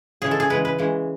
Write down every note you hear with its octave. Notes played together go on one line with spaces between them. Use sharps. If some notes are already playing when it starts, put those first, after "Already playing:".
C#3 E3 G#3 G#4
A4
G#4
C#3 E3 G#3 B4
B4
C#3 E3 G#3